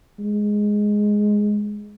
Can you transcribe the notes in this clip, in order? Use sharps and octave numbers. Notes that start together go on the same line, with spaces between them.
G#3